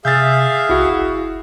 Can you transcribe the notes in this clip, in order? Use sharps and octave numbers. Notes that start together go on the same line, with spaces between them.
C3 G#4 E5 F5 G6 A6
B1 E4 F#4
F#1